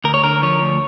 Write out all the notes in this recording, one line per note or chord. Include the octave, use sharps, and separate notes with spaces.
D2 A#4
C#5
D3 A#4
F3 C#5
D2